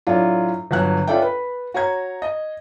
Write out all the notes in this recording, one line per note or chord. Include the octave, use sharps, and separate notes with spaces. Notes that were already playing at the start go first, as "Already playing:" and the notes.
A2 F#3 D4 F4
G1 F#3 F#6
C#4 F4 A4 D5 E5 G5
B4
F#4 C#5 A#5 G#6
D#5